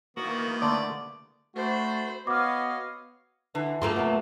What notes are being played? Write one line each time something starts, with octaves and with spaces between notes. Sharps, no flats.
D#3 E3 A#3 B3 F#4 A#4 B4
D3 A3 D5
A3 D4 F#4 C5 B5
B3 F#4 C#5 D#5 F5 D6 F6
D3 E3
A3 A#3 F4 G#4 A#5
C3 F#3 B3